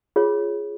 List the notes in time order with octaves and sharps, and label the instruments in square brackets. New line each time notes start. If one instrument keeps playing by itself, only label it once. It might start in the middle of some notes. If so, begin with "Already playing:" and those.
[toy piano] F4 G#4 C#5